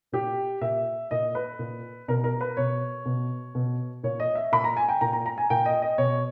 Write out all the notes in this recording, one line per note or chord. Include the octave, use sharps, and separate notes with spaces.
A#2 G4
A#2 E5
A#2 D#5
B4
A#2
B2 A#4
A#4
B4
B2 C#5
B2
B2
A#2 C#5
D#5
E5
A#2 B5
A#5
G#5
G5
A#2 A#5
A#5
A#5
G#5
A#2 G5
D#5
D#5
B2 C#5